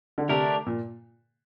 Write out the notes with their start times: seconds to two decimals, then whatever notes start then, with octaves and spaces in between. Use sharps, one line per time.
0.18 D3
0.29 C3 A3 D4 G4 A#4
0.67 A#2